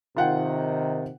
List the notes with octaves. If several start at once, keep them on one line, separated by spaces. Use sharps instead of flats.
C3 D#3 F4 F#5 G5